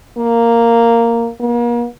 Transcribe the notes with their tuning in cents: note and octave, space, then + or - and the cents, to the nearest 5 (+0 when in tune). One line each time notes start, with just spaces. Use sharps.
A#3 -5
A#3 +40